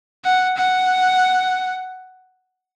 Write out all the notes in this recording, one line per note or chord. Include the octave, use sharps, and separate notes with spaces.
F#5
F#5